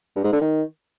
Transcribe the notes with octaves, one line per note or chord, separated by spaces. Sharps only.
G2
G#2
D3
D#3